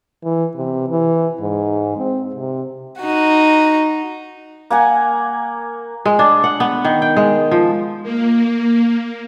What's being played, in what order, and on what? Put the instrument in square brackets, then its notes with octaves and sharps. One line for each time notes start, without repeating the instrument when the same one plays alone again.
[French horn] E3
C3
E3
G#2
C4
C3
[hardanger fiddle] D#4 F#4
[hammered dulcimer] A#3 F#5 G#5
[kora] G#3
D4
F#5
B3
D#3
G5
G#3
F3
[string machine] A#3